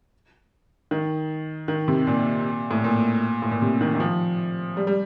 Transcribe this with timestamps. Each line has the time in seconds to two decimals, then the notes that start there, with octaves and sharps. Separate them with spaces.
0.91 D#3
1.68 D#3
1.88 C3
2.07 A#2
2.71 A2
2.84 A#2
3.42 A2
3.51 A#2
3.62 C3
3.81 D#3
3.94 D#3
4.00 F3
4.77 G3
4.87 G3